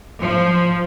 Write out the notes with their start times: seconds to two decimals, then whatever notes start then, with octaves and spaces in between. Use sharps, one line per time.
0.20 F3